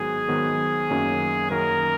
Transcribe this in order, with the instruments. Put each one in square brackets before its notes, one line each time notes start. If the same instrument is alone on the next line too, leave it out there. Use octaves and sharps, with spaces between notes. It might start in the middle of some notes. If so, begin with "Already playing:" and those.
Already playing: [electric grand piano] G#2 D#3 F#3 B3 F#4 [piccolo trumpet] G#4
[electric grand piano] G#2 D#3 F#3 B3 F#4
F#2 D#3 F#3 A#3 C#4
[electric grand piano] F#2 D#3 F#3 A#3 C#4 [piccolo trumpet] A#4